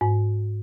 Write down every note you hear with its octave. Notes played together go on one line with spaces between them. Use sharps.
G#2